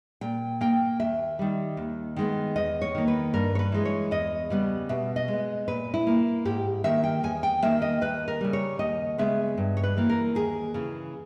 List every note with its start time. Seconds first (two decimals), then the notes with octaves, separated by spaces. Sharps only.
0.21 A#2 G5
0.61 A#3 G5
1.00 D#2 E5
1.39 D#3 G3
1.77 D#2
2.16 D#3 G#3 B3
2.56 E2 D#5
2.82 C#5
2.95 D#3 A#3
3.08 B4
3.33 G2 A#4
3.55 C#5
3.59 B4
3.72 E3 G#3
3.85 C#5
4.11 E2 D#5
4.50 C#3 G3 B3
4.89 B2 E5
5.16 D#5
5.28 G#3
5.33 B3
5.68 A#2 B4
5.94 E4
6.07 A#3
6.45 G#2 G4
6.84 D#3 A#3 E5
7.04 G5
7.23 E2 G#5
7.43 G5
7.63 D#3 A#3 E5
7.82 D#5
8.01 D#2 B4
8.28 A#4
8.41 C#3 G3
8.53 C#5
8.79 D#2 D#5
9.18 C#3 G#3 B3 E5
9.58 G2
9.77 C#5
9.83 B4
9.97 E3 A#3
10.09 A#4
10.35 D#2 G#4
10.74 C#3 E3